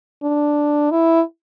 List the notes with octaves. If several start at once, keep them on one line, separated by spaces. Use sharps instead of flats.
D4
E4